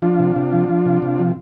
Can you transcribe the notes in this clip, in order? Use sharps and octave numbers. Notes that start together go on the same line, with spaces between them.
F3 D4 F4
C3
C3
F3
F3
C3
C3
F3